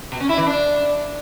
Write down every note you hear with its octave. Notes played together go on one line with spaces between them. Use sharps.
B2
C#4
E4
E3
D4